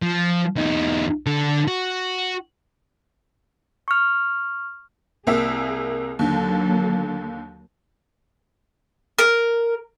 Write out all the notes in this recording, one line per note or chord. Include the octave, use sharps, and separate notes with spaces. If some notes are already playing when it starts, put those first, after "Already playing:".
F3
E2 D#4
D3 A4
F#4
C#6 F6
C2 A#3 G#4 E5
D#2 D3 F#3 A#3 A4
A#4